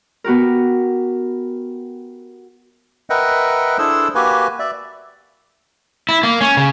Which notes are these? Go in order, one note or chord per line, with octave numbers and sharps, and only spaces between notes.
B3 F#4 G4 A#4
A#4 B4 D#5 E5 F#5 G5
D4 E4 G#4 A4 C5 E6
A#3 F#4 G4 B4 G#5
D5 E5
E4
A#3
C#4
C#3